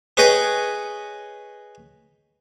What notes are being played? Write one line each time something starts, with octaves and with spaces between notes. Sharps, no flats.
G#4 B4 C#5 D#5 G5